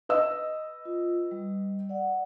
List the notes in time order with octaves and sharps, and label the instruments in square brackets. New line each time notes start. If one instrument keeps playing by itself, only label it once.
[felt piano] B4 D#5 E6
[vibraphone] F4
G3
D5 F#5